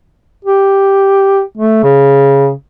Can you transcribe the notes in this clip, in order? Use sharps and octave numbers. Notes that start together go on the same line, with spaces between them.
G4
A3
C#3